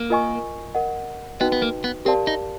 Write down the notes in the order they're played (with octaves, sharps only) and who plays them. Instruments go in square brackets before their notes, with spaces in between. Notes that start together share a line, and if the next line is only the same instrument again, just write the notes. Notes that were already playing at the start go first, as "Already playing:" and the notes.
Already playing: [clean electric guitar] A#3
[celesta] F4 A#4 D#5 G#5 C#6
A#4 D#5 F#5
[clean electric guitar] B3 [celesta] D#4 F#4 B4 D#5 G5
[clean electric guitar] B3
A#3
B3
[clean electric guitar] C4 [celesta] G4 A#4 D5 F5 A5
[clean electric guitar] D#4